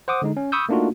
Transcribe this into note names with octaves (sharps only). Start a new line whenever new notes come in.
C5 F#5 D6 D#6
D3 G#3 D#4
C#4
B5 C#6 D#6 E6 G6
A3 A#3 D4 D#4 F4 F#4